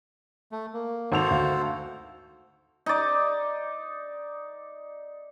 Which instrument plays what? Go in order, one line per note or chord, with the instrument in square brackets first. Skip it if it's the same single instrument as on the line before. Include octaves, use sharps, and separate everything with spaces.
[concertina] A3
A#3
[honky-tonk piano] G#1 F#5 F7 [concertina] F#4 A4 C5
[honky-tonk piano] D2 F5
[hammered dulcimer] D#4 D5